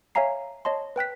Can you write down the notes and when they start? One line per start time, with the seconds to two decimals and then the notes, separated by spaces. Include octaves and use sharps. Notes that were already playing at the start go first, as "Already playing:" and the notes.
0.15 C#5 E5 F5 G#5 A#5 C7
0.65 C#5 D#5 A5 C6
0.96 B4 G5 F#6 B6